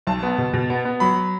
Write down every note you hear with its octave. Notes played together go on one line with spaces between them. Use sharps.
B1 A5
B3
B2
B2
B3
B3
F#3 B5